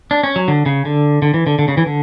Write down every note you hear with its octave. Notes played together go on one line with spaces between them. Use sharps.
D4
C#4
F#3
D3
C#3
D3
D3
E3
D3
D3
C#3
E3
D3